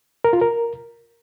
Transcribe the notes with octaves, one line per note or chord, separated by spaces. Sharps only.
A#4
F4
A#4